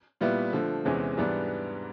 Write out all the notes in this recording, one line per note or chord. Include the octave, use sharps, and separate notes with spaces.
A#2 G3 B3 E4
D3 F3 A3
E2 C3 E3 G#3 C#4
G#2 E3 G3 B3 D4